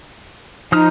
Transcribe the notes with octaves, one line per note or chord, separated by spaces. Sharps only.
F3 D#4 D#6 F6